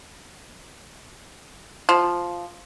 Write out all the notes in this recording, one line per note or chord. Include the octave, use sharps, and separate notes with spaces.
F3